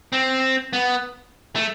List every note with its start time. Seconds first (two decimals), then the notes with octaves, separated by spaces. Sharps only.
0.13 C4
0.73 B3
1.55 A3